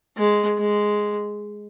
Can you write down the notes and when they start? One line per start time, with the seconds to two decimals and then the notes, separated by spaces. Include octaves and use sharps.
0.17 G#3
0.58 G#3